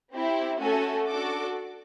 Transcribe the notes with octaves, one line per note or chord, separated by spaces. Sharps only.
C4 E4 G4
A3 C#4 F#4 A4 G#5
D4 F#4 A4 D6